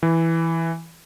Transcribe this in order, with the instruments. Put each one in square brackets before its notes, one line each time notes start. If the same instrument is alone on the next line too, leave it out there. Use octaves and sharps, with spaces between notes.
[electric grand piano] E3